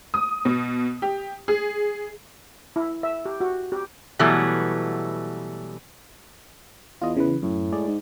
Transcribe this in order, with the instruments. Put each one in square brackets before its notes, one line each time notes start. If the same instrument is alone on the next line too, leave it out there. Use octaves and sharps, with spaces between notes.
[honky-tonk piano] D#6
B2
G4
G#4
[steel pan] E4
E5
G4
F#4
G4
[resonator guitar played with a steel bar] B2 E3 F#3 G3 A3 B3
[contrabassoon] E2 [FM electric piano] F4 D#5
[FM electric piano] C#3 E3 B4
[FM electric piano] F#2 [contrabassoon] A2
[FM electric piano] G#3 G#4 D5
[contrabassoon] G#2